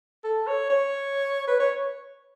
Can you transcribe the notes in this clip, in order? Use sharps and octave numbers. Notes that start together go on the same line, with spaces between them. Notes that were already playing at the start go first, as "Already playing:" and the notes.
A4
C#5
C#5
B4
C#5